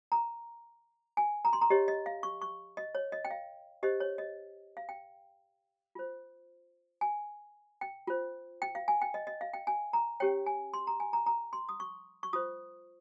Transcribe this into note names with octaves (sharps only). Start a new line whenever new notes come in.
A#5
G#5
A#5
C6
A#5
G4 C#5 D#5
D#5
F5
C#6
C#6
D#5
C#5
D#5
G5
F5
G4 C5 D#5
C#5
D#5
F5
G5
F4 C5
G#5
G5
F4 C5
G5
F5
G#5
G5
D#5
D#5
F5
G5
G#5
A#5
C#4 G4 C#5 G5
G#5
C6
A#5
G#5
A#5
A#5
C6
D#6
C#6
C#6
F4 C5 D#6